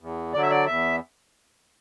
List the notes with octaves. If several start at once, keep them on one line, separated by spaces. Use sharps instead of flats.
E2
D3 F#3 D5
E5
D5
E2 E5